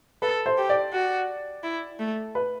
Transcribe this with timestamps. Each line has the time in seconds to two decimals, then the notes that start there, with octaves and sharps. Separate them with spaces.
0.22 A4 B4
0.46 C5
0.58 G4
0.69 D5
0.93 F#4
1.64 E4
2.00 A3
2.35 B4